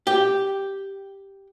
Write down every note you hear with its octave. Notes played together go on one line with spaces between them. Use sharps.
G4